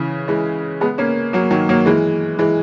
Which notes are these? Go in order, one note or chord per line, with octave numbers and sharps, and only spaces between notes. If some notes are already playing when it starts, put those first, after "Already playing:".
Already playing: C#3 E3
E3 G#3
G#3 B3
A#3 C#4
F#3 A#3
D#3 F#3
F#3 A#3
E3 G#3
E3 G#3